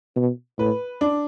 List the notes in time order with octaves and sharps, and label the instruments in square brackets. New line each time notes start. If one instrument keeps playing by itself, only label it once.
[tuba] B2
[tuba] A2 [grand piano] B4
[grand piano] D4